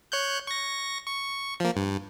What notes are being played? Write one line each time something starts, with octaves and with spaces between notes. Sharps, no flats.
C#5 F#6 G6
C#6 A#6
C#6
F3 A#3
G2